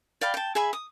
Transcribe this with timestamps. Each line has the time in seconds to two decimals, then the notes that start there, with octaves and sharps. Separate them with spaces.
0.21 D5 F5 G5 B5
0.34 G5 A5
0.55 G#4 E5 G#5 B5
0.73 D#6